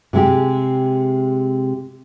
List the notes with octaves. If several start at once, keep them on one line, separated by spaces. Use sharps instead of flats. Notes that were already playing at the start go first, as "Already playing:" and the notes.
C3 G#3 G4